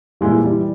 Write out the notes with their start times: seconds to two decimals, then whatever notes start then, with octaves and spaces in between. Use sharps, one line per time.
0.21 A#2 E3 G3 G#3 E4
0.44 E3 G3